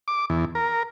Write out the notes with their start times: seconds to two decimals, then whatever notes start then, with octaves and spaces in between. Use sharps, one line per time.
0.08 D6
0.30 E2
0.55 A#4